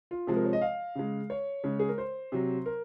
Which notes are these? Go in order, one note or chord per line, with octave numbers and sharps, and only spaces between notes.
F4
C3 F3 G#3
A#4
C#5
D#5
F5
C#3 G#3
C#5
C#3 G#3
G#4
A#4
C5
C3 F#3
A#4